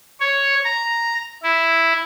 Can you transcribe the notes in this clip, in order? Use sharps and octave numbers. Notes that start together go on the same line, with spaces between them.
C#5
A#5
E4